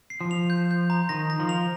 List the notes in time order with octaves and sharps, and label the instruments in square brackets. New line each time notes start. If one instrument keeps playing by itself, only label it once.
[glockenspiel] C7
[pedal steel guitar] F3
[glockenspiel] F7
G6
G6
A#5
[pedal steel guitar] D#3 [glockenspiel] A#6
[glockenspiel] A#6
[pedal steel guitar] F3
[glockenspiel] F7